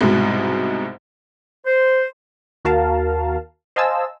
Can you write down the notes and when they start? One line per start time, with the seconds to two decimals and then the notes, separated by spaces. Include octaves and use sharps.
0.01 C2 G#2 B2 G#3
1.65 C5
2.65 D#2 F#4 A#4 F5 A5
3.76 C5 D#5 F5 G#5 A5 E6